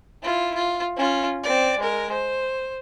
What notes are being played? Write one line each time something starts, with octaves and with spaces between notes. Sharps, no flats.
E4 F4
F4
C#4 F4
C4 D5
G#3 A#4
C5